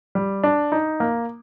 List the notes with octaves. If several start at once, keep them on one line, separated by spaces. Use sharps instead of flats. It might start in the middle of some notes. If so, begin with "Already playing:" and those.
G3
D4
D#4
A#3